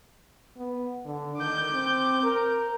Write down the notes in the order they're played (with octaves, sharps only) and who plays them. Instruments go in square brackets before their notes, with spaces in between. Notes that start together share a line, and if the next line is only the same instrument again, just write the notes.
[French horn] B3
D3
[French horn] D#3 [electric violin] D6 G6
[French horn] C4
A#4